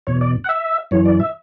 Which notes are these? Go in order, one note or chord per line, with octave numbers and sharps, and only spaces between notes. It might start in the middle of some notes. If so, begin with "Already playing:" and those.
E2 B2 C#5
D5
F#5
E5
F#2 E3 C#5
D5
E5